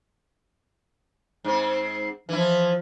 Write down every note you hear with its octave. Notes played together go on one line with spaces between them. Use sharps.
G#2 C4
E3 F3 E4